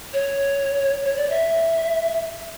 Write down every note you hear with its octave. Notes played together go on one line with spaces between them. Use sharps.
C#5
C#5
D5
E5